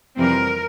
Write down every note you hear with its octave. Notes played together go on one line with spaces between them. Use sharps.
F2 C3 E3 G3 C4 A#4